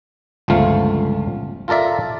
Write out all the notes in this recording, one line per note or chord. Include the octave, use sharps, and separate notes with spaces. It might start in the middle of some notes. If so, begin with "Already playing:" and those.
G1 C#2 F3 A3 F5
F4 A4 A#4 D5 E5